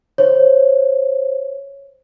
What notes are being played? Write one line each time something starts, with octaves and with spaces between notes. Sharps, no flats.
C5 C#5